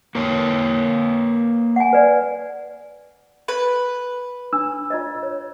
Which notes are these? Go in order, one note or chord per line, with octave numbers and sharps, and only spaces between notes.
A#3 B4 C#5
F#5 G#5
B4 D5 G#5
B4
D4 E6
F4 D5 D#5
C#5